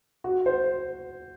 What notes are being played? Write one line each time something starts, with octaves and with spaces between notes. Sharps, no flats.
F#4
C5